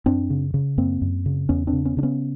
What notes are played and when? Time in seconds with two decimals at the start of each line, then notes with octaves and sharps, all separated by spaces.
0.06 F#2 C4 D4
0.30 C#3
0.54 C#3
0.78 F#2 A#3 C4
1.02 F#2
1.26 C#3
1.49 E2 B3 C#4
1.67 C4 D4
1.73 C#3
1.85 B3 C#4
1.97 C#3 D4
2.03 B3 C#4